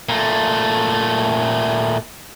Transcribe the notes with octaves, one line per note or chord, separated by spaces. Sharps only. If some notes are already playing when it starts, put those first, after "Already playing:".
A#2 A3